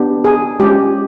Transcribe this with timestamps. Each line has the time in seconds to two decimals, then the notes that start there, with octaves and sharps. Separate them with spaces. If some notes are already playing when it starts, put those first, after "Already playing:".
Already playing: B3 D4 G4
0.24 G#4
0.60 G#3 C#4 F4 G4